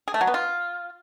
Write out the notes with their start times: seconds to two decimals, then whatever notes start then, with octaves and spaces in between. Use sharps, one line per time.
0.08 G#4
0.14 A3
0.21 F#3
0.27 B3
0.34 F4